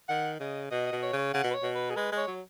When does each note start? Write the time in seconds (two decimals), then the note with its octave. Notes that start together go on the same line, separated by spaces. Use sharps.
0.09 D#3 F#5
0.40 C#3 D#5
0.71 B2 D#5
0.87 D#5
0.92 B2
1.03 C#5
1.13 C#3
1.18 C#5
1.34 C#3 F#5
1.44 B2
1.51 B4
1.54 C#5
1.63 B2
1.75 B4
1.90 G#4
1.96 G#3 B4
2.12 G#3
2.17 C#5
2.27 F#3